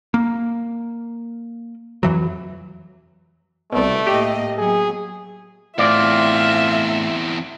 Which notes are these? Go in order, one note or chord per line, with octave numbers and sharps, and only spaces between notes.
A#3
F2 E3 F#3
C2 B2 A3 B3 D5
A2 A#3 G4 D#5
F#3 B3 G#4
E2 A2 C4 F4 D5 E5